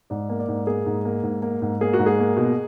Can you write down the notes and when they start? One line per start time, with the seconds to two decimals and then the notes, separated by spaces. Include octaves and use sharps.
0.10 G#2 D5
0.29 A#3
0.39 D5
0.48 G#2
0.67 A#3 G#4
0.86 G#2
1.05 A#3
1.23 G#2
1.42 A#3
1.62 G#2
1.81 A#3 G#4
1.94 F#4
1.99 G#2
2.06 G#4
2.19 A#3
2.37 B2